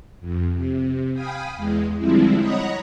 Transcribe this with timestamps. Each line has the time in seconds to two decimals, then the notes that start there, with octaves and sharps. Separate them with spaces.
0.20 F2
0.52 C3
1.13 F5 G5 G#5 B5 D#6
1.55 E2 G#3
1.97 D3 F3 G3 G#3 C4 E4
2.38 C#5 D#5 F#5 A#5 B5 D#6